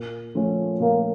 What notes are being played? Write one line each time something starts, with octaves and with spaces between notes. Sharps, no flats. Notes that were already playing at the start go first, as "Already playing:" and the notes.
Already playing: A#2
F3 A3 C#4 F4
A#2 A#3